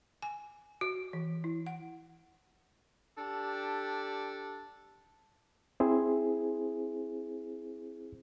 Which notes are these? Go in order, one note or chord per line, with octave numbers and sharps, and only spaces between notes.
G#5
F#4
E3
E4
F#5
D4 G4 A4
C4 E4 G#4 C5